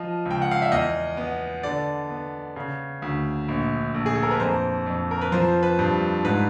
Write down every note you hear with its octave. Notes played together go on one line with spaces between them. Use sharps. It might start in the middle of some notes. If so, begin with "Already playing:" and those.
Already playing: F3 D#5
C#2
G5
F#5
F5
E5
E2 D#5
B3
D3 D5
B3
C#3
D2
A#1
A#1
G#4
A4
A#4
B4
F2 C5
F2
A#4
B4
F3 C5
B4
G2
G#2 B4